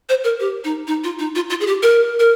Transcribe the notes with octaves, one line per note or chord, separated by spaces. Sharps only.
C5
A#4
G4
D#4
D#4
F4
D#4
F4
F4
G#4
G4
A#4
A#4